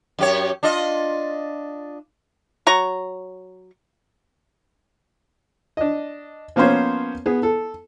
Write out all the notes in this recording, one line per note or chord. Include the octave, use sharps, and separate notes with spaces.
F#2 G4 C#5
D4 F4 D#5
F#3 A#5 C#6
D4 D#5
F3 A#3 B3 C#4 C5 C#5
B3 G#4
A4